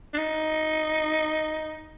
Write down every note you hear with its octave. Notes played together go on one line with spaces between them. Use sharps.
D4
D#4